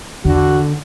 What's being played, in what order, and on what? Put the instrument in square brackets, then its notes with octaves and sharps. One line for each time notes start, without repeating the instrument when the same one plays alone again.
[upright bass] E2 [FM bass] D3 [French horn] F#4